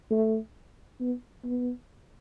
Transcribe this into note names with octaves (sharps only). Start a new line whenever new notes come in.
A3
B3
B3